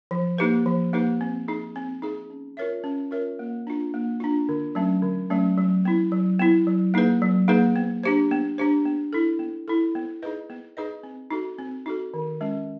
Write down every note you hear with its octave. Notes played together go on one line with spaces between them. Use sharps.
F3
A#3 D#4 G4 B4
F3
A#3 D#4 G4 B4
C4
D#4 G#4
C4
D#4 G#4
C#4
F4 A#4 C#5 E5
C#4
F4 A#4 C#5 E5
A#3
D4 F4
A#3
D4 F4
D3
F#3 A3 C#4
D3
F#3 A3 C#4
F#3
B3 E4
F#3
B3 E4
F#3
A#3 D#4 G#4 B4
F#3
A#3 D#4 G#4 B4
B3
D4 G4 C5
B3
D4 G4 C5
B3
E4 A4
B3
E4 A4
B3
D#4 G#4 B4 D#5
B3
D#4 G#4 B4 D#5
C4
D#4 F#4 A4
C4
D#4 F#4 A4
D#3
G#3 C#4